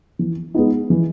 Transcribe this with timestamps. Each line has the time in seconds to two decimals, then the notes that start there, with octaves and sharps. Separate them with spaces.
0.19 E3
0.54 G#3 B3 D#4
0.90 E3